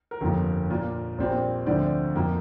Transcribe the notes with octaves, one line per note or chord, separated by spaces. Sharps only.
A#4
G1 F2 F3 A#3
A#2 A#3 F4
A#1 A#2 G3 C4 F4
D2 D3 F3 C4 D5
F2 F3 A#3